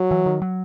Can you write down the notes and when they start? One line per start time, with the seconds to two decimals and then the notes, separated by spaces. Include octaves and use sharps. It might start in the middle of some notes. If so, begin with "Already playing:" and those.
Already playing: F#3
0.11 E3
0.26 D#3
0.42 F#3